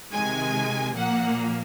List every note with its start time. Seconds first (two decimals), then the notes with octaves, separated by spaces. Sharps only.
0.13 C3 D#3 G#3 G#5
0.95 A#2 F3 A#3 F#5